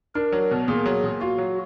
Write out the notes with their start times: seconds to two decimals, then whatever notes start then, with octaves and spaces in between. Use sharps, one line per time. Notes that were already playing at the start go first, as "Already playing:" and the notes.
0.15 D4 A#4
0.32 F#3
0.51 B2
0.68 A#2 G#4
0.86 F#3
1.04 A#2
1.21 F4 F#4
1.38 F#3